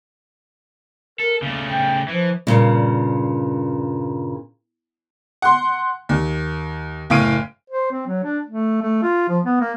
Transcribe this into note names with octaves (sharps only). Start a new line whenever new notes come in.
A4 A#4
C#3 A3 A#3
G5
E3 F3
G2 A#2 C#3
F#5 C6
D#2
F#1 A2 F5 D7 D#7
C5
C4
F#3
D4
A3
A3
F4
F3
B3
A#3